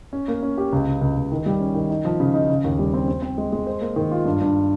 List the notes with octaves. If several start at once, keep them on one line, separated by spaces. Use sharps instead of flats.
C#4
A#3
C#4
G4
C#2
C#3
C#2
C#2
D#3
G3
C#4
D#3
D#4
F3
C#3
D#4
C#3
D#2
G3
C4
C4
C4
G#3
G#3
C5
A#3
D#3
F4
G2
G2